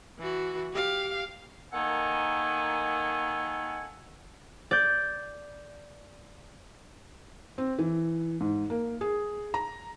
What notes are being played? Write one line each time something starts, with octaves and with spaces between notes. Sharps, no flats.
E3 F#4
G4 F5
D#3 A#3 A4 F#5 G#5
D5 G6
C4
E3
G#2
A#3
G#4
A#5